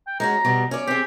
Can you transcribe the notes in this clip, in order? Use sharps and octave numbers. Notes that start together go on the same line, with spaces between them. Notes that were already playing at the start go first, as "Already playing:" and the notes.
G5
G#3 C#4 F#4 A#5
B2 G3 B3
C#4 D5
C4 G4 G#4